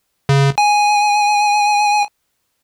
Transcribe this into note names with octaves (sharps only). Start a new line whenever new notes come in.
C#3
G#5